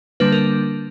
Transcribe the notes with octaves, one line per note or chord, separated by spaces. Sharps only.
D3 G3 A#3 D4 B4
A#4